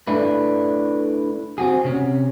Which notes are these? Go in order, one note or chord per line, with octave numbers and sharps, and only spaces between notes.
A3 D4 E4 B4
C4 F#4 G#4
C3 C#4